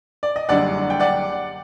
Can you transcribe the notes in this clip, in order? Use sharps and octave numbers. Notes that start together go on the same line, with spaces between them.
D5
D#5
F#1 F#2 D3 G3 D4 D5 F#5
G5
D5 F#5